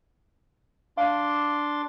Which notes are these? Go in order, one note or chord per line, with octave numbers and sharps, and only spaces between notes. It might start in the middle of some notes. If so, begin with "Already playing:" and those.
D4 F5 C6 D6